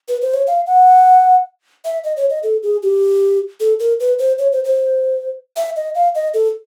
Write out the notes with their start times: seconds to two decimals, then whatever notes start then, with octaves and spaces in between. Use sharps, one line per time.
0.08 B4
0.22 C5
0.34 C#5
0.47 F5
0.67 F#5
1.85 E5
2.04 D#5
2.17 C#5
2.30 D#5
2.43 A4
2.63 G#4
2.83 G4
3.60 A4
3.80 A#4
4.00 B4
4.19 C5
4.39 C#5
4.53 C5
4.64 C5
5.56 E5
5.76 D#5
5.95 F5
6.15 D#5
6.34 A4